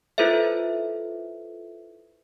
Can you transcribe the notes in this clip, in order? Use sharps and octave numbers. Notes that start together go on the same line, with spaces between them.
E4 F4 A4 B4 C5 E5